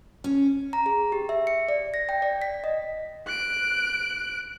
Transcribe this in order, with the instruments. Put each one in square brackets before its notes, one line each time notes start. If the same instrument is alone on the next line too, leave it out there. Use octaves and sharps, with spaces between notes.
[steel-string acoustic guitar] C#4
[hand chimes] A#5
G#4
G4
E5
C#7
D5
A#6
G5
D5
B6
D#5
[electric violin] F#6 D7